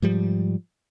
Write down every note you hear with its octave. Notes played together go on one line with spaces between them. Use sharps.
G#2 F3 G3